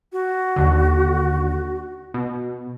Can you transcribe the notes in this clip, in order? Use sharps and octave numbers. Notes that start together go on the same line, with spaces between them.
F#4
D#2 D3
B2